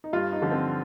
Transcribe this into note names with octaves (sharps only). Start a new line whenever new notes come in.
D#4
G2 F4
D#4
D3 F3
C4